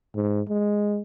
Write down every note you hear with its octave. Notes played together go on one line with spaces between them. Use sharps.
G#2
G#3